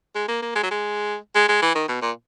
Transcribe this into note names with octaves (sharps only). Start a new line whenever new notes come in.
G#3
A#3
A#3
G#3
F#3
G#3
G#3
G#3
E3
D#3
B2
A#2